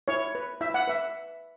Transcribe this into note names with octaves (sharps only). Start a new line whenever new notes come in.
E4 C#5
B4
E4 E5
F#5
B4 E5